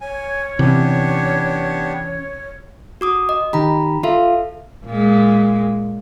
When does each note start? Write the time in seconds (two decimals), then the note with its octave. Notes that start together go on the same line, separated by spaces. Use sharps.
0.01 C#5 G#5
0.59 C3 E3 B3 C#4 D4 G4
3.01 F#4 D6 D#6
3.29 D#5
3.53 D#3 G4 A#5 B5
4.03 F4 A4 E5 F5
4.86 A#2 G#3